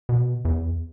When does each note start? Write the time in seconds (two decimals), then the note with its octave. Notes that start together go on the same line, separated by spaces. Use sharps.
0.09 B2
0.45 E2